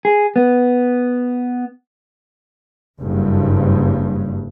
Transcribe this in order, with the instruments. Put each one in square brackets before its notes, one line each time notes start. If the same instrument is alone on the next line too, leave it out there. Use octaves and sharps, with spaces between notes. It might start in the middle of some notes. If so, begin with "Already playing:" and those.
[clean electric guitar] G#4
B3
[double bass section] F#1 G2